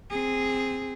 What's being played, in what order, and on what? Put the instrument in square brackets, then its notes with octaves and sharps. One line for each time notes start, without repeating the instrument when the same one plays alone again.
[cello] C4 G#4